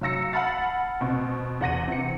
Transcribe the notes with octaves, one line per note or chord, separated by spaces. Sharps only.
F#3 F5 E6 A#6 C#7
F#5 A5 B5 F6 A6 C7
B2 C4 C#6
E2 F#5 A#6 D#7
C3 E3 C#7